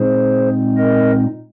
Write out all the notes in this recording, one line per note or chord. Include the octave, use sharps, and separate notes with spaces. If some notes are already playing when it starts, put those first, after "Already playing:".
Already playing: A#2 G#3 C4 D#4 G#4 C5
A#4 D#5